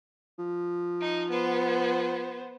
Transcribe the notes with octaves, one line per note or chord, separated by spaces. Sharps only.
F3
D#4
B3 C5